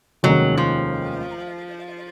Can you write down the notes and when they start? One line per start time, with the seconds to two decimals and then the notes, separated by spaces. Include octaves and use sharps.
0.23 F1 D#2 D#3 F#3 G#3 C#4
0.57 F3